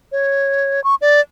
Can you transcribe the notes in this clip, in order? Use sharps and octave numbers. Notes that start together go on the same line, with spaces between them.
C#5
C#6
D5